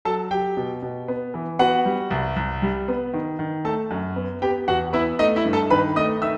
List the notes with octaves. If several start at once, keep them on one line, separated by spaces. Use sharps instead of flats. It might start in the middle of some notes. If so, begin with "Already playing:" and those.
F#3 A4 A5
F#3 G4 G5
B2
B2
B3
E3
B3 F#4 F#5
G3
C2
C2
G3
B3
D#3
D#3
A3 A4 A5
F#2
B3
B3 G4 G5
E2 F#4 F#5
B3 E4 E5
A3 D#4 D#5
E4 E5
G2
A4 A5
D#3 B4 B5
A3 D#5 D#6
D#3 E5 E6